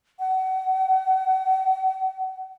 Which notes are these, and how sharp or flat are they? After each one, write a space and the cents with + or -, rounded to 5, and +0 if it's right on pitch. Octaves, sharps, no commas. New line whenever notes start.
F#5 +35